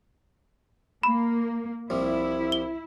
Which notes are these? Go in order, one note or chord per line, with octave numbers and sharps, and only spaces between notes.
A#3 B5
C2 F3 G3 E4
G7